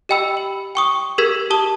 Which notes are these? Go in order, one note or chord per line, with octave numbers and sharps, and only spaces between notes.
G4 D#5 G5 B5 E6
F#7
G5 C#6 D#6
G4 G#4 A#4 E6 G#6 B6
G4 A5 D#6 G7